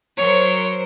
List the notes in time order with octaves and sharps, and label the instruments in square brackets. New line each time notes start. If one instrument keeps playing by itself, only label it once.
[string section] F#3 A#4 C5 [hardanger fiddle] C#5